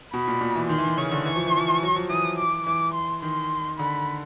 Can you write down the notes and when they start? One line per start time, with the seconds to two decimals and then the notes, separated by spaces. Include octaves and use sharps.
0.14 B2 B5
0.28 A#2
0.41 A#2
0.56 E3
0.69 D#3 C6
0.78 E3
0.87 D#3
0.97 C#3 C#6
1.12 D3
1.25 E3 C#6
1.36 F3
1.47 E3
1.57 F3
1.68 E3
1.82 F#3
1.96 F3
2.09 E3 D#6
2.38 D6
2.66 E3 D6
2.94 C6
3.22 D#3 C6
3.79 D3 B5